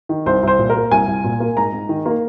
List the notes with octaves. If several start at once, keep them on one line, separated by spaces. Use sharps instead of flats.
D#3
C2 C5
C2 C5
A#2
A#4
A#3
C2 G#5
C2
A#2
A#3
G#2 A#5
G#2
D#3
A#3